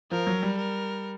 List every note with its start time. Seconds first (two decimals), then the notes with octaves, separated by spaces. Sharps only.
0.11 F3 A#4
0.27 F#3
0.43 G3
0.58 A#4